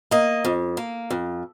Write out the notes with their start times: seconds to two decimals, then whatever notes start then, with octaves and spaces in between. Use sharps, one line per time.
0.11 A#3 D#5
0.45 F2
0.77 A#3
1.11 F2